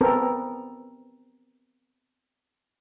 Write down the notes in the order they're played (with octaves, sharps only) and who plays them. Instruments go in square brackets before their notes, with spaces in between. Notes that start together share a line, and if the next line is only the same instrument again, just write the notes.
[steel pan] B3 C4 A4 A#4